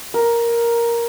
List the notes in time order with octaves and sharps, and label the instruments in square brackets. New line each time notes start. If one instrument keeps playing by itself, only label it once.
[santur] A#4